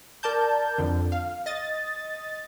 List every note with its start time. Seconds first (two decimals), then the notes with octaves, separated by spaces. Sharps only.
0.23 A#4 D5 A5 G6
0.78 F2 D3
1.12 F5
1.46 D#5 A6